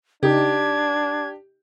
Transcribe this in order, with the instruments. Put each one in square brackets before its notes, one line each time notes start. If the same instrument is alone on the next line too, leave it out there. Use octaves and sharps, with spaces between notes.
[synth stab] C#3 D#4 [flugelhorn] D4 [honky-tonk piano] G4 [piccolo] G#6